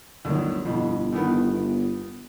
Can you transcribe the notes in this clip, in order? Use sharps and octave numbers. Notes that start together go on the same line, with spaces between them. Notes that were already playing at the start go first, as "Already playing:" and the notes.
G1 D2 D#3 F#3
G1 F2 B2 E3
A2 D#3 B3